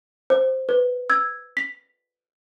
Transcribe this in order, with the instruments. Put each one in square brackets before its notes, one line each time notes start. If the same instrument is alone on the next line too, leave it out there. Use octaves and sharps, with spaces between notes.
[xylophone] C5
B4
E6 G#6
B6